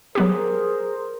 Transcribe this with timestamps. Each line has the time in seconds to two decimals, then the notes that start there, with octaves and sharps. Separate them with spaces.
0.15 F#3 B3 G4 G#4 A#4 C5